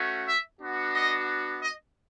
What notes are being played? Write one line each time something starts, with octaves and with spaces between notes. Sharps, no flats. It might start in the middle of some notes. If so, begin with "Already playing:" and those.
Already playing: A3 C#4 F#4
E5
B3 D4 F#4
D#5
D#5